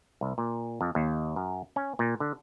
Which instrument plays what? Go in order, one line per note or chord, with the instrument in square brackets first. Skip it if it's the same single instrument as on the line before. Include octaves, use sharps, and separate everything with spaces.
[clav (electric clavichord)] C2
A#2
F2
D#2
F#2
C#4
A#2
D3